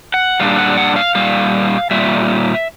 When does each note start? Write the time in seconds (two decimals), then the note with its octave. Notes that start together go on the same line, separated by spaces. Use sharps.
0.14 F#5
0.39 A#2 G3 D4 F5
0.58 F#5
0.77 F#5
0.96 F5
1.15 A#2 G3 F5
1.91 A#2 G3 E5